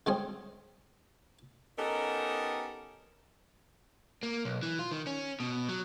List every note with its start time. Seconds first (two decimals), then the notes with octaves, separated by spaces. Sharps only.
0.06 D3 G#3 C4 C#4 G#4
1.78 B3 C#4 D#4 G4 A4 A#4
4.23 A#3
4.45 B1
4.63 E3
4.79 F4
4.92 D#3
5.07 C#4
5.40 B2
5.69 F#3